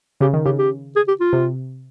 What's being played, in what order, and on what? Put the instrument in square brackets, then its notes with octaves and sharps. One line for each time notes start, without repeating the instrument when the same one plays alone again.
[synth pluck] C#3 [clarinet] G4
[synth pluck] D#3
[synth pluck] C#3 [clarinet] G4
[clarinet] G4
G#4
G4
F4
[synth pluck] C3